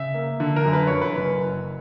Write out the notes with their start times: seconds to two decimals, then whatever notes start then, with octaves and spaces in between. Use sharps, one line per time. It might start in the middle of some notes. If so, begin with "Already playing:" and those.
Already playing: C#3 E5
0.14 A#3
0.40 D3
0.56 A#4
0.65 F#2
0.73 B4
0.87 F#2 C#5
1.02 B4
1.16 F#1